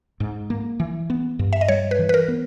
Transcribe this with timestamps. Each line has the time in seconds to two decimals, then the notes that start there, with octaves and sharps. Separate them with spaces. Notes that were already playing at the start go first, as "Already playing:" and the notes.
0.20 G#2
0.50 A#3
0.80 E3
1.10 B3
1.39 G2
1.53 E5
1.61 D#5
1.68 G3 C#5
1.91 B4
1.99 E3
2.09 B4
2.14 A#4
2.28 B3